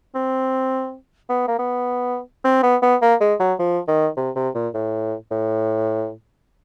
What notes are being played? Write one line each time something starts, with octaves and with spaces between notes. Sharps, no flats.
C4
B3
A#3
B3
C4
B3
B3
A#3
G#3
F#3
F3
D#3
C3
C3
A#2
A2
A2